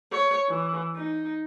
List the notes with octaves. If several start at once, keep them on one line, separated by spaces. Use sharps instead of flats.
C#5
E3
D#4